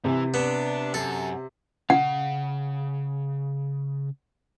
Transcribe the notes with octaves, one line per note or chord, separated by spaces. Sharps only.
C3 E3 F3
B3 D4
F#2 A4
C#3 F5 F#5